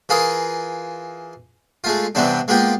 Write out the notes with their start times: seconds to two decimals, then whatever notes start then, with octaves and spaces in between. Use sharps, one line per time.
0.09 E3 F4 G#4 A#4 D#6
1.84 G#3 A3 F4
2.15 G2 C3 E3 G3 B3 D4
2.48 G#3 A#3 B3 F4 G4